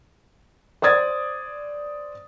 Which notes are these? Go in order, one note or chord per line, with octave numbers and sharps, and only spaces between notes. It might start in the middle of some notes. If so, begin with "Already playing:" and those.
C5 D5 D#6 G#6 A6